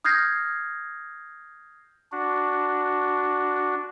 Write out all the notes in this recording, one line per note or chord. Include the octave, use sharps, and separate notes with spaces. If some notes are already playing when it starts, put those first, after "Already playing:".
D#6 F6 G6 G#6 A#6 C7
D4 F#4